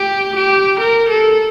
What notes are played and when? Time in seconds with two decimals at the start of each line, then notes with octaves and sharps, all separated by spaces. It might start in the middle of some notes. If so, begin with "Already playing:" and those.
Already playing: G4
0.36 G4
0.81 A#4
1.10 A4